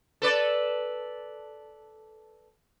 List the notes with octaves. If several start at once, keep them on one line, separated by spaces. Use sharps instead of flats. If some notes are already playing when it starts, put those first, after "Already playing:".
A4 B4 D5